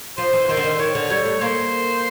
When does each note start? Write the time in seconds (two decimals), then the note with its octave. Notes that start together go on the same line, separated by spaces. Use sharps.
0.17 F3 C5
0.33 E3
0.49 D#3 C5
0.57 D3
0.64 D#3
0.79 D#3 C#5
0.95 D3
1.10 G3 C#5
1.25 A3
1.41 A#3 C5